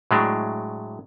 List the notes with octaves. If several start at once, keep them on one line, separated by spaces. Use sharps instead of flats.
A2 F#3 G#3 D4